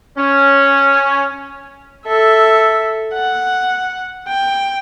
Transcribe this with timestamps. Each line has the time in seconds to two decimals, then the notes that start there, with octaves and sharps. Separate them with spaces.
0.17 C#4
2.07 A4 E5
3.14 F#5
4.28 G5